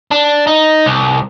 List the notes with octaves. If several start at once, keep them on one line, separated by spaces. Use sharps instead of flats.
D4
D#4
C2